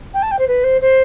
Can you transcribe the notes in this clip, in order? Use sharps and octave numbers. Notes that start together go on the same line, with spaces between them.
G5
A5
G5
C5
B4
C5
C5